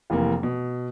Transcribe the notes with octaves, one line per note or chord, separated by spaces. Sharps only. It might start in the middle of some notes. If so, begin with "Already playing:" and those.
F1 E3 A#3
B2